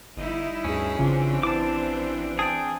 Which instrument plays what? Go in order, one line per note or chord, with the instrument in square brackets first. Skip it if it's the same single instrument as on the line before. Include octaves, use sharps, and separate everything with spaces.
[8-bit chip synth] G1 [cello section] G3 D#4 E4
[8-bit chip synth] D2 G2 G#4 [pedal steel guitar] C#4
[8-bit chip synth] A1 [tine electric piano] C#3 F4 [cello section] E3 C4 D4
[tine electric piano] E4 [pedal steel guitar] A5 D6
[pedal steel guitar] G#4 G5 [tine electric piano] A5 D#6